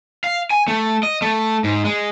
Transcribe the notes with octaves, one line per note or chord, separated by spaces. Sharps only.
F5
G#5
A3
D#5
A3
G#2
G#3